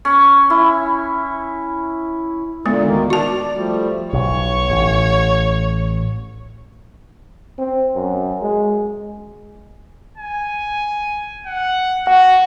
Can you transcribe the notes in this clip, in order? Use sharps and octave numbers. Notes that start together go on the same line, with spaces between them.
C#4
E4
A#2 D3 G#3 B3
D2 D#3 A#3
F#4 D5 A5
F3 G3 A3
B1 C#5
A1
C4
F#2
G#3
G#5
F#5
F#4 F#5